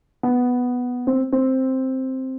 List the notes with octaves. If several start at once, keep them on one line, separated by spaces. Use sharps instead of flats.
B3
C4
C4